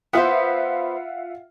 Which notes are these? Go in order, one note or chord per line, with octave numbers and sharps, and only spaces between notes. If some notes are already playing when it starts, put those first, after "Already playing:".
B3 F4 B4 C5 E5 F#5